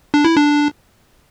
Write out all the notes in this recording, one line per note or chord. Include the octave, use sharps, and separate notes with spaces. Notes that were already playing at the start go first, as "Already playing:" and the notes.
D4
E4
D4